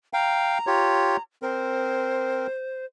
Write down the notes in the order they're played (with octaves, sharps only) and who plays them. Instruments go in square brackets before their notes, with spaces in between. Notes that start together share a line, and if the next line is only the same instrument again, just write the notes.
[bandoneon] F5 G5 [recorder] A#5
[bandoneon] F4 G4 C#5
[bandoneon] C4 A#4 [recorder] C5